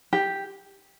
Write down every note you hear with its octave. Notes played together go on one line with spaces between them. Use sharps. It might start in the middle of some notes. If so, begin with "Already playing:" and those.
G4